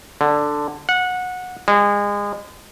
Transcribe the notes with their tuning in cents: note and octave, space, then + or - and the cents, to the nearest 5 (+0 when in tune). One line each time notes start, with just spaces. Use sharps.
D3 +5
F#5 -20
G#3 -30